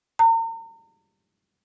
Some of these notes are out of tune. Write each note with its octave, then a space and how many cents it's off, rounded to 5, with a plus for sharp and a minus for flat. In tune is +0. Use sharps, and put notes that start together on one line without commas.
A#5 -40